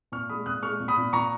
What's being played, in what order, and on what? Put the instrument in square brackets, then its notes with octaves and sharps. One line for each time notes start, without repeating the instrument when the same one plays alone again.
[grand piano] A#2 C#6 F6
G#3 B5 D#6
A#2 D#6 F#6
G#3 C#6 F6
A#2
B5 D#6
A#2
A#2 A#5 C#6